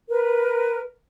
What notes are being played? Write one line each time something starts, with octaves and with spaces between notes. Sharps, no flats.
A#4 B4